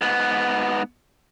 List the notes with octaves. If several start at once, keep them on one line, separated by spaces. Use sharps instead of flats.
G#2 B3